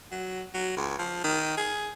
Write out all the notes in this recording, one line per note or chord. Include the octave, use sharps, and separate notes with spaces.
F#3
F#3
C#2
F3
D#3
G#4